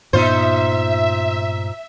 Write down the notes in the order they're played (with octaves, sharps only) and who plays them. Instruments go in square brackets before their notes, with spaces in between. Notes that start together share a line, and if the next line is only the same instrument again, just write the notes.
[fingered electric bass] G2 A#2 B3 [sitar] D#4 F4 C5 [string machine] E5